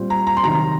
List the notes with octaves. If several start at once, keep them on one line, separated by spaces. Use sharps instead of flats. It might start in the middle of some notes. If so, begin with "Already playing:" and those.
Already playing: A#2 G3 C4
A#5
A#5
C6
C3 D#3 F#3 A#5